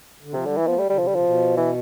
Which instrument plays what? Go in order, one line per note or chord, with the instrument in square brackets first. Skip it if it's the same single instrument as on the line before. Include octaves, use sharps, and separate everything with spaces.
[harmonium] D3
[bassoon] C3 [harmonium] F3
[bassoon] D3 [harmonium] G3
[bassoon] E3
[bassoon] F3 [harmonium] B3
[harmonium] A3
[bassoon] G3
[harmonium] D3 [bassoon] G3
[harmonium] C3 [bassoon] F3
[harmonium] D3 [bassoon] G3
[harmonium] C3 [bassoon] F3
[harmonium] B2
[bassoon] E3